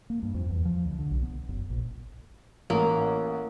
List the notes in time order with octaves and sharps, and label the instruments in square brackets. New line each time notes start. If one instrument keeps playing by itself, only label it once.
[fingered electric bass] A#3
G2
F2
E2
F3
D2
D3
B1
B3
F#1
A#1
[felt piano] A1 [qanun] A#3